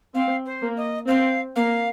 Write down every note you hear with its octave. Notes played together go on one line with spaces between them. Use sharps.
C4 F5
C5
A#3
D#5
C4 F5
A#3 F5